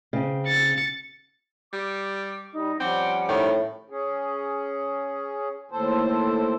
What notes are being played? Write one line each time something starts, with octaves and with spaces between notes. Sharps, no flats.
C#3 C4
A6 C#7
G3 D6
G3 D#4
F3 G3 C4 C#4 F#5 D6
A2 D#3
C#4 G#4
D#2 A2 A4 C5